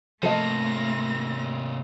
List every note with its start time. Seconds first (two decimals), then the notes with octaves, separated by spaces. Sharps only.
0.23 C3 F3 A3 A#3 A4 D#5 A#6